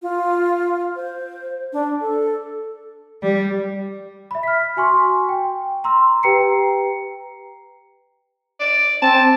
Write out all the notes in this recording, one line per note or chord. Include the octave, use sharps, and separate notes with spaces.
F4
C5
D4
A4
G3
E5 B5
F6 B6
F#4 G#5 C6 C#6
G5
A#5 C6 E6
G4 B4 G5 A#5 C7 C#7
D5
C4 A5